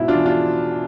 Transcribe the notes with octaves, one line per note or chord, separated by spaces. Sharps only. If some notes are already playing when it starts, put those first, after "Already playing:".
Already playing: G#2 B2 E4
D4 F4
E2
D4 F4